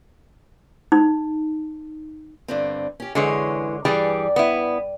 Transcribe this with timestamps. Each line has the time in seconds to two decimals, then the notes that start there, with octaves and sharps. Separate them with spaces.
0.92 D#4
2.48 G2 D3 C4
3.00 C#4 G4
3.15 F#2 D3 E3 G#3 G#4 C#5
3.85 G2 E3 G3 G#4 D5 G5
4.36 B3 E4